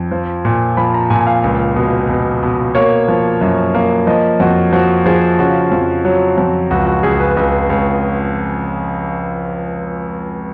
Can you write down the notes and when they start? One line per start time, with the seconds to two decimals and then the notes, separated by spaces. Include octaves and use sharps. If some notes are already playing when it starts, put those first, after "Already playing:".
Already playing: F2
0.11 F3
0.45 A#2
0.77 F3 B5
0.94 A#5
1.10 A#2 G#5
1.27 F5
1.44 C#2
1.76 B2
2.09 B2
2.43 B2
2.75 A#3 C#5
3.08 F3
3.41 F#2
3.75 A#3
4.07 F3 D#5
4.40 F2 F#4
4.73 F3 F#4
5.06 F3 G#4
5.39 C#3 F#4
5.72 F2
6.05 F#3
6.38 F2
6.71 C#2 F#4
6.87 F#4
7.03 C#2 G#4
7.20 B4
7.37 C#2
7.70 C#2